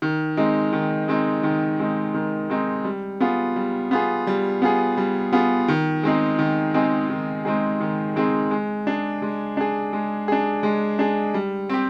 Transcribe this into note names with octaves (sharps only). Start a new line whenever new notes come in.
D#3
G#3 C4 D#4
D#3
G#3 C4 D#4
D#3
G#3 C4 D#4
D#3
G#3 C4 D#4
G3
B3 F4 G#4
G3
B3 F4 G#4
G3
B3 F4 G#4
G3
B3 F4 G#4
D#3
G#3 C4 D#4 G#4
D#3
G#3 C4 D#4 G#4
D#3
G#3 C4 D#4 G#4
D#3
G#3 C4 D#4 G#4
G#3
D4 G#4
G#3
D4 G#4
G#3
D4 G#4
G#3
D4 G#4
G3
C4 G4